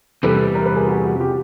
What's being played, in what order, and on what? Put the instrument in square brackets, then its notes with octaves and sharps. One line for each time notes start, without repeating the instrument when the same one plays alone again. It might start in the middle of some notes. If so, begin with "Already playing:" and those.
[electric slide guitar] E2 C3 E3 G3 [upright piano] A4 B4
[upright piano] A#4
B4
G#4 A#4
F#4 G#4
F#4 G#4
G#4
F4 G4